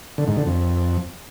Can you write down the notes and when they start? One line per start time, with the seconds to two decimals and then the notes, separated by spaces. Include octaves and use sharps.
0.18 D3
0.27 G#2
0.37 D3
0.46 F2